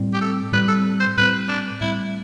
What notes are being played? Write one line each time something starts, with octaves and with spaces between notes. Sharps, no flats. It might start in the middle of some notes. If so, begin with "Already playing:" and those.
Already playing: A2 G3 C4
G4
A4
A2 G3 C4 B4
A4
C5
A2 G3 C4 B4
D4
A2 G3 C4 E4